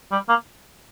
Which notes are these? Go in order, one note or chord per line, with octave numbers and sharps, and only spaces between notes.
G3
A#3